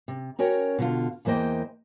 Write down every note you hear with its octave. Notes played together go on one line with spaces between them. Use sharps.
C3
C#4 F#4 A#4 C#5 G5
B2 D3 F4
E2 E3 A#3 C5 D#5 G5